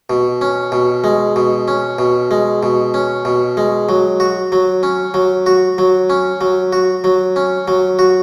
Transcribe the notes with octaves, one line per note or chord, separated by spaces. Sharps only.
B2
C#4
B2
G#3
B2
C#4
B2
G#3
B2
C#4
B2
G#3
F#3
F#4
F#3
C#4
F#3
F#4
F#3
C#4
F#3
F#4
F#3
C#4
F#3
F#4